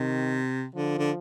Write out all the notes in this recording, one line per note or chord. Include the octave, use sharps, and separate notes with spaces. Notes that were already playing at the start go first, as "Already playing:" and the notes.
Already playing: C3 D#3
D3 F3
D3